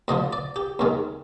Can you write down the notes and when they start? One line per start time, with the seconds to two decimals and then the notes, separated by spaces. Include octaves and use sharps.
0.08 D2 D3 F3 D#5
0.33 D5
0.56 G4
0.79 D#2 D#3 G#3